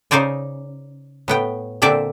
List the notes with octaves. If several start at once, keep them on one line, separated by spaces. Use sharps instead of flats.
C#3 D#4 C5 D5 G#5
A2 B3 G5
A#2 D3 C4 D5 E5